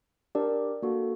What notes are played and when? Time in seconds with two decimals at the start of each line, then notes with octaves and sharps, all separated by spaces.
0.35 D4 G4 A#4 D5
0.82 A#3 D4 F#4 A4